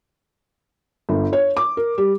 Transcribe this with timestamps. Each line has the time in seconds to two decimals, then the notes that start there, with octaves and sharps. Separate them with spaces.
1.09 G1
1.33 C#5
1.57 D6
1.77 A#4
1.98 G3